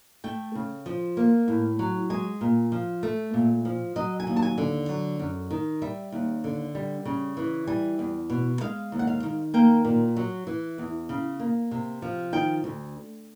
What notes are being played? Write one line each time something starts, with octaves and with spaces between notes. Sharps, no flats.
A3 G5
C#3
F3
A#3
A2
F#3
G#3 G#5
A#2
F3
A3
A#2
F3
F#3 D#5
G#5
D#2
A5
G#5
D3
F#3
F#2
D#3
G3 E5
D#2
D3
G3
C#3
E3
G3 G#5
E2
B2
G#3 F5
D#2
F#5
F5
D#3
A#3 G5
A#2
F#3
E3
E2
C#3
A#3
C3
F3
D#3 G5
D2